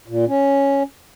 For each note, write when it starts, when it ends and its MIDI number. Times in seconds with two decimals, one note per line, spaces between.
0.08 0.25 46
0.27 0.83 61